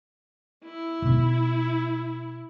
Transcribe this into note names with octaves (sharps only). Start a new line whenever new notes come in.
E4
B2 D#4